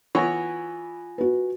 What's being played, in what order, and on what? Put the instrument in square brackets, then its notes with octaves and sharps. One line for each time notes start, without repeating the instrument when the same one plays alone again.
[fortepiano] E3 B3 C#5 [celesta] F4 G#5 A#6
[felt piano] F#4 B4